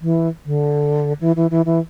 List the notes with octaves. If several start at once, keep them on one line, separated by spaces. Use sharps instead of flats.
E3
D3
E3
E3
E3
E3